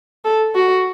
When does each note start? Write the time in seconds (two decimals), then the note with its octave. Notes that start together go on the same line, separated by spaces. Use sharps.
0.25 A4
0.55 F#4